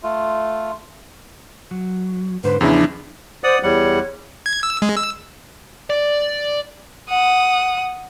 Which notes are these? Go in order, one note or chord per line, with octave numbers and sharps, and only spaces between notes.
A3 F4
F#3
G#2 D3 B4 C5
E2 C#3 F3 C#4 D4 E4
C5 D5 F#5 D#6
E2 G3 C#5 F#5
G#6
E6
G#3
E6
D5
F#5 D#6